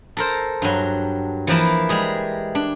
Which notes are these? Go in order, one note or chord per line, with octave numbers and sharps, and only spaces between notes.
A4 A#4 C5
G2 F#3
E3 F3 A#3 E4
G3 G#3 G#4
D4